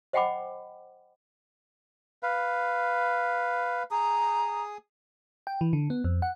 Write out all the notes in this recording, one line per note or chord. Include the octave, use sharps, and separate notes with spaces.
C5 D#5 F#5 G5 B5 D6
B4 F5
G#4 A#5 D#6
G5
E3
D3
B3
F2
F#5